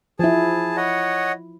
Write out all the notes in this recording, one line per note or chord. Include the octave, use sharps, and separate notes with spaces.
F3 E4 G#4 A5
C#5 D#5 F#5